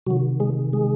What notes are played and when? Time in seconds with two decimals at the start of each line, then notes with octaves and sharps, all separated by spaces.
0.07 C3 D#3 F#3 F#4
0.40 G#3 G#4
0.73 G#3 G#4